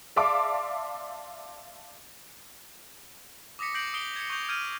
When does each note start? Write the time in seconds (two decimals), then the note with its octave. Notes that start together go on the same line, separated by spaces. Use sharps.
0.16 D5 E5 F5 A5 C6 D6
3.59 D6 D#6 A#6 B6 C#7
3.74 G6 A#6 C7 D7 F#7
3.94 D#6 C7 D7 F7 G7
4.16 G#6 C#7
4.30 C#6 G6 F7
4.49 F6 G6 G#6 D#7